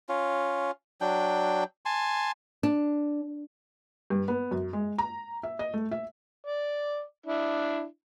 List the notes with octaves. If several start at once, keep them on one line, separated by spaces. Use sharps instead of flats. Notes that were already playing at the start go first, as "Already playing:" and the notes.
C#4 F4
F#3 D4 G5
G#5 A5 C6
D4
G2
B3
F#2
G#3
A#5
E5
D#5
A3
E5
D5
D4 E4